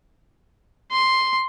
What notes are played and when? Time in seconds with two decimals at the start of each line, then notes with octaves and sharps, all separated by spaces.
0.92 C6